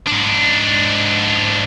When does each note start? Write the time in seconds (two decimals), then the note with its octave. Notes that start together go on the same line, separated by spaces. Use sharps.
0.07 G#2 D4